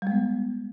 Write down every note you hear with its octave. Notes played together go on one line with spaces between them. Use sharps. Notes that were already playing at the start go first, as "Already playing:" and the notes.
G3 G#3 B3